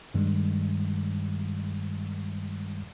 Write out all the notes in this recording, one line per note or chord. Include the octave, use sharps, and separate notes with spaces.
G2 D#3 G3 G#3